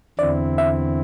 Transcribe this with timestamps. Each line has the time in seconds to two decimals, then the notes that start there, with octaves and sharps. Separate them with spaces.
0.19 E2 D3 C4 E4 D5
0.58 E5